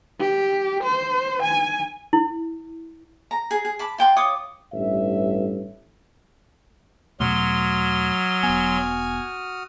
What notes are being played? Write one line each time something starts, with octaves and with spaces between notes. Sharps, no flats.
G4
C5
G#5
E4
A#5
G#4
G#4
A5 B5 D6
F4 G5 C6
F4 C#5 D6 D#6
A1 G2 E5
E2 B2 F#3 A3 F#4 C6 D#6 F6
E1 B3 G#5